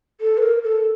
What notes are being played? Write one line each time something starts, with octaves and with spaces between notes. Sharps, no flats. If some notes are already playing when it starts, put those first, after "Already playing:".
A4
B4
A#4
A4